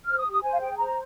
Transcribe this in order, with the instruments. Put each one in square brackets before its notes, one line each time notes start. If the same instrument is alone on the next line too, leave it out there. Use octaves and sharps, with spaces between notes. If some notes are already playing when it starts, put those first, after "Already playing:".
[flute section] C5 F6
D#6
G4
D#6
C5 G#5
F5
G#4 G5
C5 A#5